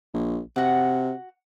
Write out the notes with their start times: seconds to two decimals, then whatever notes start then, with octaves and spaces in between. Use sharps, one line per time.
0.14 A#1
0.56 C3 F#4 F#5